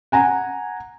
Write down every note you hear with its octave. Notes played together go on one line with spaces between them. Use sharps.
F#5 G#5 A#5